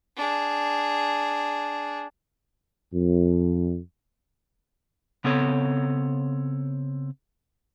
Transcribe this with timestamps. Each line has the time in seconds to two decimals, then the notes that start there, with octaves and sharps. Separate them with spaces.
0.17 D4 G#4
2.93 F2
5.24 C#3 B3 C4 A4 C#5